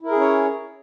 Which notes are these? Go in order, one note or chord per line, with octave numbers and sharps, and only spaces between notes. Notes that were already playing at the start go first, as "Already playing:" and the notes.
C#4 E4 G#4 A#4 C#5